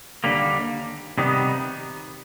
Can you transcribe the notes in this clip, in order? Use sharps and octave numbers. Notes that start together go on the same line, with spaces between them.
D#2 D3 G3 A#3
C3 D#3 G3 B3 D#4